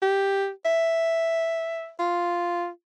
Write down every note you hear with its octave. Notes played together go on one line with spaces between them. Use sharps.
G4
E5
F4